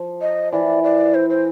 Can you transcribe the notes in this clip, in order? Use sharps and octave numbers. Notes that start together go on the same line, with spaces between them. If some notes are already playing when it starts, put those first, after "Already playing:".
Already playing: F3
D#5
E3 D5
D5
C5
C5